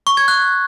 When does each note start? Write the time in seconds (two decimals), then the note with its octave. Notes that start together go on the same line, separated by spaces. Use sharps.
0.07 C#6
0.17 G#6
0.28 F#6